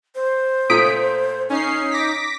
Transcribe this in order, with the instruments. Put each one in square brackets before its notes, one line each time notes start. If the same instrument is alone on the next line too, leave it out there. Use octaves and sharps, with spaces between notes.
[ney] C5
[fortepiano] A#2 A3 [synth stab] D#6 B6 D7
[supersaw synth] C#4 C7 [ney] D#4
[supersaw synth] D6 A#6 B6